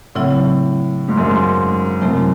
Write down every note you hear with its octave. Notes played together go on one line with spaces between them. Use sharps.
A2 C#3 F#3 C4 E4
G#2
F#2
G#2
F#2 C3 F#3 A3 C4 E4